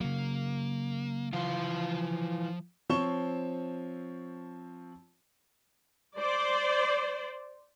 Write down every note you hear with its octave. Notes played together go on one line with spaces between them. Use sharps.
C#3 F#3 A#3
E3 F3 F4 C6
F3 C4 C#5 C#6 E7 G7
C5 D5